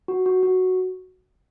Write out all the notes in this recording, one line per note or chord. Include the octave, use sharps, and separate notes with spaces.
F#4
F#4
F#4